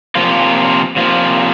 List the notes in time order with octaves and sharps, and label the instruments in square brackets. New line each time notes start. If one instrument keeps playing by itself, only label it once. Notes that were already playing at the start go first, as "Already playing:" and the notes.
[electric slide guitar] C3 F3 A#3 F4
C3 F3 A#3 F4